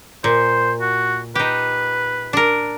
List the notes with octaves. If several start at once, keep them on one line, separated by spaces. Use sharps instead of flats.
A#2 C5
F#4
D#4 G4 B4
D4 A#4